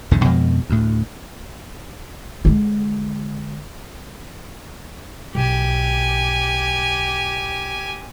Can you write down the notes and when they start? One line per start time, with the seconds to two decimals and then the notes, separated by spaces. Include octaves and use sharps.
0.11 B1 E2 G#2 D3
0.24 F2 B2 F3 G#3
0.69 D2 A2
2.45 D3 G#3
5.35 B1 G4 G#5